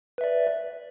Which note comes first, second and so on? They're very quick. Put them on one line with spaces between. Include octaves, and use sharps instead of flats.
B4 E5 D5